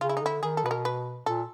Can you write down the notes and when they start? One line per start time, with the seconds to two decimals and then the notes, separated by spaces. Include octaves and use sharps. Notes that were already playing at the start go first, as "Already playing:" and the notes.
0.01 C#3 F4
0.09 E4
0.17 D#4
0.22 D3 E4
0.43 D#3 G#4
0.57 A4
0.64 B2 B4
0.71 A#4
0.85 B4
1.26 A#2 A4